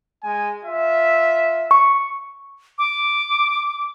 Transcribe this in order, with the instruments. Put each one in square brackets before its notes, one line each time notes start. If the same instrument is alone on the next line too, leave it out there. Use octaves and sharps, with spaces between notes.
[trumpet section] G#3 G#5
F4 E5
[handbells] C#6
[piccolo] D6